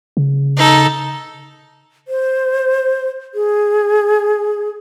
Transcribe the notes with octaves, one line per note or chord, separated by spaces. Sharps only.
C#3
D#4 A4
C5
G#4